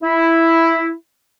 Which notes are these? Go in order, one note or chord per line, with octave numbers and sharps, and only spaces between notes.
E4